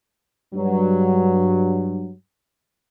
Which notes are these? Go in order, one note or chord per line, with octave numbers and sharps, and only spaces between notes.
G2 F#3